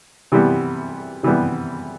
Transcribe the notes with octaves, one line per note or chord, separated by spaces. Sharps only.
C3 E3 G3 B3
C3 E3 G3 B3